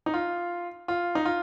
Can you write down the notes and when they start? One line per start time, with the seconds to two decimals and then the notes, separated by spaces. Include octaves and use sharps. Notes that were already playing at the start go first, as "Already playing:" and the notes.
0.06 D#4
0.14 F4
0.88 F4
1.15 D#4
1.25 F4